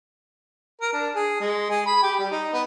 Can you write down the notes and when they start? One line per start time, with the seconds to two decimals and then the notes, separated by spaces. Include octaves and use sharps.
0.81 A#4
0.93 D4
1.15 G#4
1.40 G#3
1.70 G#4
1.86 B5
2.03 G4
2.19 G3
2.31 D#4
2.53 B3